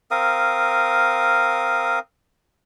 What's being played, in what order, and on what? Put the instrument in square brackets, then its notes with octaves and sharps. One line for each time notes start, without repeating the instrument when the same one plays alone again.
[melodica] C4 A#4 F5 D#6